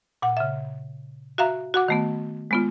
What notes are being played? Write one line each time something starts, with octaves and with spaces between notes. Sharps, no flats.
A#2 F#5
C#3 E5
F#4 E5 F5 A#5
F#4 F#5 D6
D#3 A3 B3
G#3 B3 F4